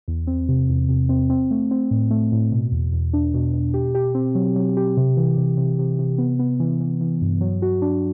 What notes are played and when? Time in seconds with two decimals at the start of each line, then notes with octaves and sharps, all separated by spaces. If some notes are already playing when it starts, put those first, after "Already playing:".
0.08 E2
0.27 C4
0.49 C3
0.69 E2
0.89 C3
1.09 C4
1.30 C4
1.51 A3
1.71 C4
1.91 A2
2.11 A3
2.32 A2
2.52 B2
2.72 E2
2.93 E2
3.13 D4
3.34 B2
3.53 B2
3.74 G4
3.95 G4
4.14 C4
4.35 F#3
4.56 F#3
4.77 G4
4.97 C3
5.17 E3
5.37 C3
5.57 C3
5.79 C3
5.99 C3
6.18 B3
6.39 B3
6.60 E3
6.80 E3
7.01 E3
7.21 G2
7.41 F#3
7.62 F#4
7.82 D4